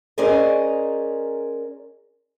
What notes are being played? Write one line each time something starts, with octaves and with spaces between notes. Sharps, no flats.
C#4 G#4 A#4 C5 D5 D#5